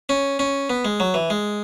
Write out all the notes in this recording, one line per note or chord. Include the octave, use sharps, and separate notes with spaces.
C#4
C#4
B3
G#3
F#3
E3
G#3